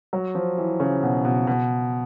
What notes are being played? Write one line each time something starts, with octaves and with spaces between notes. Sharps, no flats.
F#3
F3
E3
C#3
B2
B2
B2